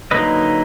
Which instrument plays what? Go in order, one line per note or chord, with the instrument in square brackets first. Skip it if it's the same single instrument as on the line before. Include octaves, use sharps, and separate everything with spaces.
[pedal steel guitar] D3 F#3 A#3 D#4 B4 D#5